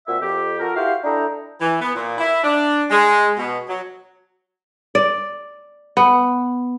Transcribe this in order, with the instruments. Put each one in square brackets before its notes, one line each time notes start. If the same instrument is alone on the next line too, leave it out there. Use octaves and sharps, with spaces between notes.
[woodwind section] A#2 C4 F#4 E5
F2 G4
F4 F#4 A4 A#4
E4 F#4 G4 C5 F5
D4 E4 A4 D#5 G5 A#5
[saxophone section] E3
B3
A#2
E4
D4
G#3
B2
F#3
[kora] D5
B3